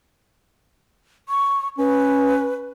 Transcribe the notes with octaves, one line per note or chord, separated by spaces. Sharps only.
C#6
C#4 B4